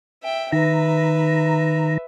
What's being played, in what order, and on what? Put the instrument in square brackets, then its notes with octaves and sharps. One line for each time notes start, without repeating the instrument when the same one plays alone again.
[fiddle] E5 G5
[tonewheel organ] D#3 A#5 [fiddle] B4 E5